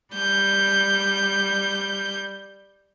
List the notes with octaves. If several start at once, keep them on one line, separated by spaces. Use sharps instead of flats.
G3 G6